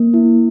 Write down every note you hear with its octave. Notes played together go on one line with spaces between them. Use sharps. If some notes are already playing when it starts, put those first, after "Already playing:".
Already playing: A#3
E4